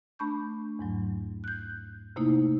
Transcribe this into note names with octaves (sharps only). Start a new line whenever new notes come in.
A3 D4 A5 B5 C#6 G6
E2 G#2 F#3
F#6 G6
C3 A3 A#3 D#4 E4